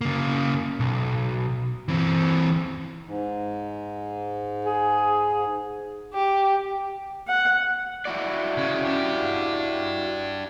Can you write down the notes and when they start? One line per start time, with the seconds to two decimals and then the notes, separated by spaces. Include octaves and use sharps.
0.01 C#3 A#3
0.80 B1
1.88 E3 C4
3.05 G#2
4.65 G#4
6.14 G4
7.27 F#5
8.05 E4 F#4 D5
8.57 C#3
8.85 D4 G4